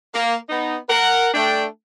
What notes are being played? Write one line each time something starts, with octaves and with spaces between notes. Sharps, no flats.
A#3
B3 D#4
A#4 F#5
A3 D4 G5